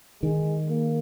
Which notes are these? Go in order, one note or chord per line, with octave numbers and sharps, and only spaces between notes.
D#3 G#3
A#3